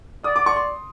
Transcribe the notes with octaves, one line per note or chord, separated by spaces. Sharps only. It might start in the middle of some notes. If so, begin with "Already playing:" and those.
D5 D#6
D6
C#6
C6